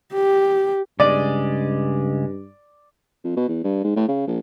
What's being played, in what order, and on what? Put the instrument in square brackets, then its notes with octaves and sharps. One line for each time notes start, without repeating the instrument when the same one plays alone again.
[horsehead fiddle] G4
[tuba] G2 [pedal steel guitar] C#3 G#3 D#5 [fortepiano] D5
[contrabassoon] F2
B2
E2
G2
G#2
A2
C#3
A#1